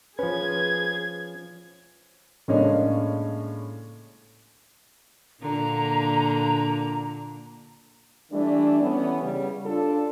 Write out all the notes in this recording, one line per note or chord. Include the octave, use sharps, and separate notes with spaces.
F3 C#4 G#4 B4 G#6
A2 C#3 G#3 A#3 C#4 D4
A#2 D3 A#3 A#5
E3 G3 A3 D4
E3 B3 C#4
C#3 G3
D4 F4 A4